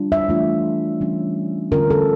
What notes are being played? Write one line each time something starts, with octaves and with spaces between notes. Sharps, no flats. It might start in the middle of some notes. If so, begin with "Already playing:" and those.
Already playing: G3 D4 F4
E5
E3 A3 D4 F4
E3 G3 C#4
D3 G3 C#4 F4 A#4
A4